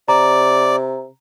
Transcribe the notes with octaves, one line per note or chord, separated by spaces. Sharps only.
C3 D5 A#5